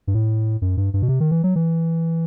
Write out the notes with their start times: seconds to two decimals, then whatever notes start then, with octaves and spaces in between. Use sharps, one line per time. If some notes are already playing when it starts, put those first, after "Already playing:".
0.07 G2
0.15 A2
0.62 F#2
0.77 G2
0.94 G2
1.02 B2
1.08 C3
1.20 D#3
1.31 E3
1.44 F#3
1.56 E3